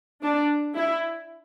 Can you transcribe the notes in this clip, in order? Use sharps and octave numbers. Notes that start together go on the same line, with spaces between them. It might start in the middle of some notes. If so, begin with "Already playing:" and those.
D4
E4